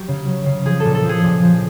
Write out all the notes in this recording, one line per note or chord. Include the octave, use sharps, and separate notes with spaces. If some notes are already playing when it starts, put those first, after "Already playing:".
Already playing: F#3 G4
C#3
F#3
C#3
F3 G#4
A#2 A4
A4
F3
G#4
A#2
F3